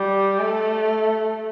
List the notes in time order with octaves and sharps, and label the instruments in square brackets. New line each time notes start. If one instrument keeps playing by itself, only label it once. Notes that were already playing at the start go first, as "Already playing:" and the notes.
Already playing: [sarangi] G3
A3